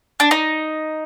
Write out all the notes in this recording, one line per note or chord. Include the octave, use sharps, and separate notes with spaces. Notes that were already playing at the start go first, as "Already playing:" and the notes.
D4
D#4